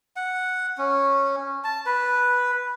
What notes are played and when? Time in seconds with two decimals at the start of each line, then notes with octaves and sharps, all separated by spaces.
0.16 F#5
0.78 C#4
1.64 A5
1.86 B4